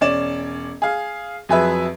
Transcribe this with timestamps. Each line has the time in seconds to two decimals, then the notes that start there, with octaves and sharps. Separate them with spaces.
0.01 E1 C#4 D5 E7
0.82 G#4 F5
1.49 F2 F#3 G#4 B4 E5